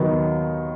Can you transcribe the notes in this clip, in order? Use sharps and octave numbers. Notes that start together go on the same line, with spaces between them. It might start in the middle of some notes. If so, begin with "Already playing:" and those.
Already playing: D#2 D#3 F#3 B3